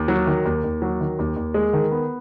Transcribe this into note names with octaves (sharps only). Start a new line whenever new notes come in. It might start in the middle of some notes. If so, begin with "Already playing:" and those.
Already playing: D#2
F#3
D#3
D#2
D#2
F#3
D#3
D#2
D#2
G#3
D#3
B3